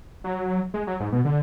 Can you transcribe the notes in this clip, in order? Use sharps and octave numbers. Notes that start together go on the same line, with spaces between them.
F#3
G#3
F#3
G#2
B2
D3